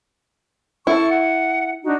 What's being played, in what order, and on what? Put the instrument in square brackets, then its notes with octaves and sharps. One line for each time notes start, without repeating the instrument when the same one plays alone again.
[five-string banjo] E4 [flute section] A4 C#6
[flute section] F#5
D4 D#4 F#4